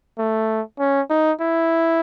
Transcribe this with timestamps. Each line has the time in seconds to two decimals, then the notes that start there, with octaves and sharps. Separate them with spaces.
0.18 A3
0.79 C#4
1.10 D#4
1.40 E4